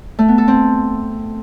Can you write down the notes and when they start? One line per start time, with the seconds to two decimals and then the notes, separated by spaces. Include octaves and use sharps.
0.19 A3
0.28 B3
0.38 A4
0.48 C4